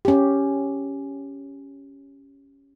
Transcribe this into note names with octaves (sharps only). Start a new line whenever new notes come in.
C#4 G4